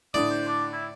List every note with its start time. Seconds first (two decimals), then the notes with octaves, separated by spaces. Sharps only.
0.14 A2 D3 D5 D#6
0.30 C5
0.48 D4
0.72 E4